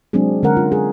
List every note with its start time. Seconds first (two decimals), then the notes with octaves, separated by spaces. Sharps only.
0.13 F#3 G#3 C4 D4 G#4
0.43 D3 G#3 C#4 A#4 F#5
0.57 F4
0.72 G#4